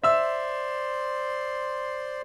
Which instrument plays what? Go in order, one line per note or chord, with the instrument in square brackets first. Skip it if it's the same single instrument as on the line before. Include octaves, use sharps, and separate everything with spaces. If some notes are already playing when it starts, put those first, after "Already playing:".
[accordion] C5 D5 C6 [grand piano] E5 E6